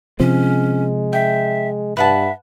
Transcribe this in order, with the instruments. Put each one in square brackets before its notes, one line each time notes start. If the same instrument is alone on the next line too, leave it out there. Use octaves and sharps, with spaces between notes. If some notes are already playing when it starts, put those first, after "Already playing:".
[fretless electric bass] C3 F3 C4 [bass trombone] G#3 [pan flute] C#4
[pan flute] E5 [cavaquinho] G5
[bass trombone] G2 [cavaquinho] B4 F#5 A5 [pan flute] E5